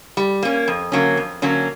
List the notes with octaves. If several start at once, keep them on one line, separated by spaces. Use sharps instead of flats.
G3
A#3 C#4
F2
D3 F#3 A#3 C#4
F2
D3 F#3 A#3 C#4